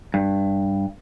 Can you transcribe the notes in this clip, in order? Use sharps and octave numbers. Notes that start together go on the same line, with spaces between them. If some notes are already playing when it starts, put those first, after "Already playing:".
G2